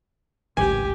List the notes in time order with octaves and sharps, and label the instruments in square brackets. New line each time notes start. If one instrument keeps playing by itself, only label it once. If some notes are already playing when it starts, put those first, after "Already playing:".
[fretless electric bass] D1 G#1 C#2 [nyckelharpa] G4 [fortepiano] G#5